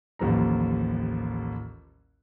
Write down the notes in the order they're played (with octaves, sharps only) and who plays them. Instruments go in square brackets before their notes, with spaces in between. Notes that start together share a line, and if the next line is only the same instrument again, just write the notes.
[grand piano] A1 D#2 F3 G3 A#5